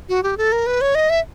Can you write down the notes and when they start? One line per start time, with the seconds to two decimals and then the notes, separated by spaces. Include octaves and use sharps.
0.09 F#4
0.23 G4
0.37 A4
0.52 A#4
0.67 B4
0.81 C#5
0.95 D#5
1.10 E5